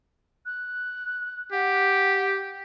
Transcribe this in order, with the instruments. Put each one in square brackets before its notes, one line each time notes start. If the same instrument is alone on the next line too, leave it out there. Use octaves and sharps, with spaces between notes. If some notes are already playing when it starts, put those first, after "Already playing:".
[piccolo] F#6
[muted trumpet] G4 [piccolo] F#5